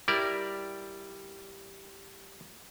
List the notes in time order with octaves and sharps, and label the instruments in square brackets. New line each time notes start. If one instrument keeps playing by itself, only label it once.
[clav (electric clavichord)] G3 E4 A#4 D5